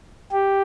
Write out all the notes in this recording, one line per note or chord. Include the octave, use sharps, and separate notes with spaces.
G4